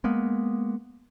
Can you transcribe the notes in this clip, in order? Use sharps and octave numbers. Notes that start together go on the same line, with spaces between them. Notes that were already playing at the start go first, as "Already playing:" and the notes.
G#3 A#3 B3